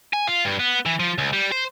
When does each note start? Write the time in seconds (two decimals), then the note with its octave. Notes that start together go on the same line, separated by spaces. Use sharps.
0.13 G#5
0.27 F4
0.45 G2
0.59 B3
0.86 E3
1.00 F3
1.18 C#2
1.33 G3
1.51 C5